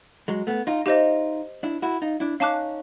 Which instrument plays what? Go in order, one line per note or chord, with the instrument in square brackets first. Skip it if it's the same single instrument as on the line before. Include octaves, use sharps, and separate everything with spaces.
[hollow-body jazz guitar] F#3 G#3
A3 B3
D#4 F4
[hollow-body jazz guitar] D#4 F4 [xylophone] G4 C5 D#5
[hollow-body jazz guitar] D4 E4
E4 F#4
D#4 F4
D4 E4
[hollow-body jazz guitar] C#4 D#4 [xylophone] F5 A5 D6 F#6